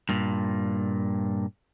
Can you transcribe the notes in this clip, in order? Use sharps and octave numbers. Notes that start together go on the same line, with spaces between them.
G2 A#2